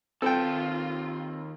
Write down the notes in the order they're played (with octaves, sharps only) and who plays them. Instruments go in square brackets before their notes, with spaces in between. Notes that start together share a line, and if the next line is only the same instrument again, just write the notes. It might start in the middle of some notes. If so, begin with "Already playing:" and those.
[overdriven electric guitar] D#2 A5 [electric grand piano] C4 [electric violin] F4 [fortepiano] A4 G5